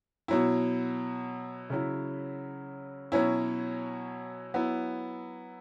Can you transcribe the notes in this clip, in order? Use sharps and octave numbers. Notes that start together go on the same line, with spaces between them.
B2 F#3 E4
C#3 F#3 E4
B2 F#3 C#4 E4
F#3 B3 E4